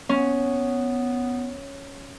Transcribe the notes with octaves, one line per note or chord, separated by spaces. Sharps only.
B3 C#4